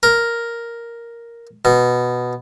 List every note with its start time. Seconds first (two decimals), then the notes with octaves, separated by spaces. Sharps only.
0.03 A#4
1.65 B2